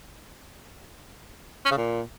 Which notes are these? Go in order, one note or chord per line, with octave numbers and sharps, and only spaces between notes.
C#4
C#3
A#2